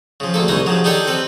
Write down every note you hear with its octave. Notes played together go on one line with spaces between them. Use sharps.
C#3 F3
D2 A#3 A4
C2 G#3 D#4 D#5
C#3 F3 F#3
D4 D#4 G4 A4 C#5 D5
C4 A4 B4